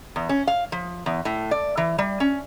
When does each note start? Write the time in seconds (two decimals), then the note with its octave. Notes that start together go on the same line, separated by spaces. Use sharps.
0.16 E2
0.29 C#4
0.47 F5
0.72 F3
1.06 E2
1.25 A2
1.51 D5
1.77 E3
1.98 G3
2.20 C#4